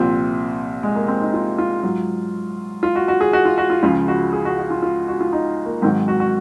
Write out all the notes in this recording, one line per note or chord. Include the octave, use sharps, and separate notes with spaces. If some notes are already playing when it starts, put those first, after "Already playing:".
Already playing: C2 A#2 F3 C4
G#3
A#3
C4
D#4
F4
F4
G#2 F#3
F4
F#4
F#4
G#4
F#4
F4
F#4
F4
C#2 C#3 F3 F4
F#4
G#4
F#4
F#4
F4
F4
F#4
F4
D#4
A#3
G#2 D#3 F#3 C4
F#4
F#4